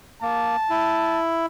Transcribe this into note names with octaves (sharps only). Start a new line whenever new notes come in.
A#3 A5
E4